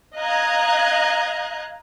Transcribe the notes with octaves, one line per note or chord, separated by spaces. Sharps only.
D#5 F5 A#5 F#6 G#6